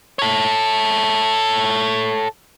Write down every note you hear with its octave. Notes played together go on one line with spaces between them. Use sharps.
A4 C#5